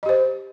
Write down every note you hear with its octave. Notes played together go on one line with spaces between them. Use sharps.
G4 C5 D#5